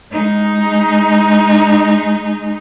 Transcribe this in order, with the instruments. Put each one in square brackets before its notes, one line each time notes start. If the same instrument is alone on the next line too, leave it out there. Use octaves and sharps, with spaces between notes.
[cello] G#3 D#4